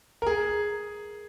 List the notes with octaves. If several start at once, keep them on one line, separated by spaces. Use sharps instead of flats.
A#4
G#4